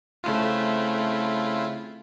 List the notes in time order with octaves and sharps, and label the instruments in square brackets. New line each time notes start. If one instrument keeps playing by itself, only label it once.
[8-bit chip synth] C#3 E4 F4 [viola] A3 C4